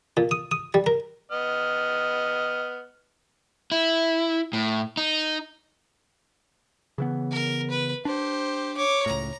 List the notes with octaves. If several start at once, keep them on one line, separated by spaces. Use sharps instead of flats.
A#2
D#6
D#6
G3
A#4
B3 D#5 F6
E4
A2
D#4
C#3 E3 B3
A#4
B4
D4 G4 C5
C#5 D6
C#2 A2 A#5